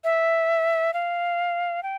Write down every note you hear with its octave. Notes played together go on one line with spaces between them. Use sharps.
E5
F5
G5